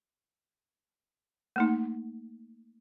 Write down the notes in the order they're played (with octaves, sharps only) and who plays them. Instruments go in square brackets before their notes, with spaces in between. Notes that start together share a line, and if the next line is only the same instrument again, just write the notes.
[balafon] A3 A#3 D#4